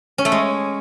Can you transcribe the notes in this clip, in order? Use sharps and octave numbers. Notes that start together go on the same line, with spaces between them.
C#4
A3
G#3